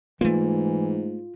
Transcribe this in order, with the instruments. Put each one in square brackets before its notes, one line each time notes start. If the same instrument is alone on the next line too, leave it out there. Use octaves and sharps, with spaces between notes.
[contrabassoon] G#2 [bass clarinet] E3 [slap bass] A3 A#3 [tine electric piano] F4